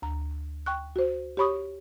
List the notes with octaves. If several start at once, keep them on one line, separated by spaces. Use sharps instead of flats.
D2 A#5
G5 C#6 F#6
F#4 C5
G4 C#5 B5 C#6 D#6